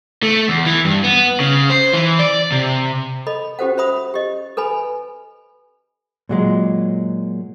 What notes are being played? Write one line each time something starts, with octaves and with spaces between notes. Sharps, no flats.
A3
E2
E3
G2
B3
C#3
C5
E3
D5
C3
A4 D#5 B5
C#4 F#4 G4 A4 C5 F#5
C5 E5 B5 D#6
G4 D#5
A4 B4 G#5 B5
A#2 F#3 G#3